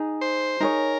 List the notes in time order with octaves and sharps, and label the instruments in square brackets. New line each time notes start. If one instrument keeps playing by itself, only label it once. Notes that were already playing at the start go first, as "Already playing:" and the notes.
Already playing: [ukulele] D#4 G#4
[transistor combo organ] C5
[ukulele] D#4 G#4 C#5 [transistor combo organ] A#4